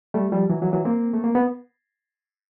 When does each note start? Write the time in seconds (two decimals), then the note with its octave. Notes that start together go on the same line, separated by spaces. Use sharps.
0.14 G3 A3
0.32 F3 G3
0.50 E3 F#3
0.61 E3 F#3
0.73 E3 F#3
0.85 A#3 C4
1.13 A3
1.24 A#3
1.35 B3